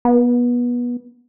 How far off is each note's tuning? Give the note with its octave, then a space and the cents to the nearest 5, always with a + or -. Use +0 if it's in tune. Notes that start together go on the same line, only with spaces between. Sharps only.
B3 -25